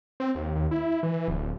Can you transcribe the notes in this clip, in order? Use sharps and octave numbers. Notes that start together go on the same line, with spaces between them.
C4
D#2
D#2
E4
E3
D1